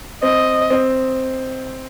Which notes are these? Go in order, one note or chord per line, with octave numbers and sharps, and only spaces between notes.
C4 D#5
C4